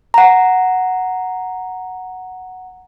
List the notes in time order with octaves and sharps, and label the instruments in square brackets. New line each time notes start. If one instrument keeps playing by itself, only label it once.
[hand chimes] F#5 A#5